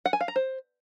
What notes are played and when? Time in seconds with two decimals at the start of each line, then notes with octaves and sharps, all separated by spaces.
0.06 F#5
0.13 G#5
0.21 F5
0.28 A#5
0.36 C5